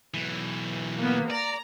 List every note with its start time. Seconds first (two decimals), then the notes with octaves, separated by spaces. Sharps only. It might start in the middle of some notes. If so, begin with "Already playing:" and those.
0.14 B1 E3
0.99 A#3 B3
1.30 D5 A#5